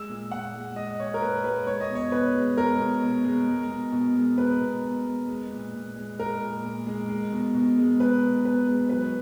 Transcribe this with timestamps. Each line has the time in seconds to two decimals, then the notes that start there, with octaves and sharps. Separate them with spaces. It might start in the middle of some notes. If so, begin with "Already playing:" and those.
Already playing: G#3 E6
0.09 A#2
0.32 A#2 F#5
0.54 G#3
0.76 G#3 D#5
1.00 A#2 C#5
1.14 A#4
1.22 A#2 B4
1.44 G#3 B4
1.67 G#3 C#5
1.81 D#5
1.90 B2
1.95 C#5
2.12 B2 B4
2.35 G#3
2.58 G#3 A#4
2.79 B2
3.03 B2
3.25 G#3
3.48 G#3
3.70 B2
3.92 B2
4.16 G#3
4.38 G#3 B4
4.60 B2
4.84 B2
5.07 G#3
5.28 G#3
5.51 A#2
5.74 A#2
5.96 G#3
6.19 G#3 A#4
6.41 A#2
6.64 A#2
6.87 G#3
7.09 G#3
7.32 B2
7.54 B2
7.78 G#3
8.00 G#3 B4
8.22 B2
8.45 B2 B4
8.68 G#3
8.89 F#3 B4